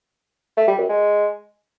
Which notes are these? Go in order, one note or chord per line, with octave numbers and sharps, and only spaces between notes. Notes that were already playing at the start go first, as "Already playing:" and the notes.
A3
G3
F#2
G#3